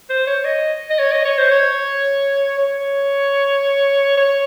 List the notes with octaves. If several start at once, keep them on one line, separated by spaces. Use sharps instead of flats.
C5
C#5
D#5
D#5
C#5
D#5
C#5
C5
C#5
C#5
C#5